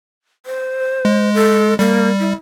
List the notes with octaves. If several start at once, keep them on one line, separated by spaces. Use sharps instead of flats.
C5
G#3
A4
G3 A#3
E4